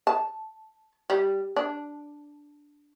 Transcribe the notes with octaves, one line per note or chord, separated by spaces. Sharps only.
A5
G3
D4